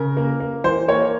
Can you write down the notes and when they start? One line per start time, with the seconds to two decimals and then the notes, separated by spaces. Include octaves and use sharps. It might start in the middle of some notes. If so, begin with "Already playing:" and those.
Already playing: C#3 A#4
0.17 A#3
0.40 A#3
0.64 E3 C5
0.88 A#3 C#5